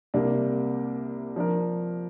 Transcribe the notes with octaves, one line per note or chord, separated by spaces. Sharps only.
C2 C3 A#3 D4
F3 D4 A#4